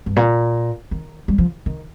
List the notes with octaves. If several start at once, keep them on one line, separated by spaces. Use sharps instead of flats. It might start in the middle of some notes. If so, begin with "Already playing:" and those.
G2
A#2
D#3
G3
F3
D#3